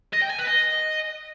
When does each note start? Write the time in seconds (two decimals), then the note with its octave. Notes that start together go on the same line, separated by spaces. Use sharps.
0.13 D#5
0.22 G5
0.30 G#5
0.39 B4
0.47 D#5